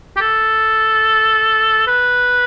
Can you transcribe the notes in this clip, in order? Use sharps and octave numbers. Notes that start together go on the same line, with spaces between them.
G4
A4
B4